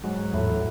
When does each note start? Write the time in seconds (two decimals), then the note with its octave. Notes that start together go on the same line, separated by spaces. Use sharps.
0.03 G#2 F#3 G#3
0.33 E2 A2 A3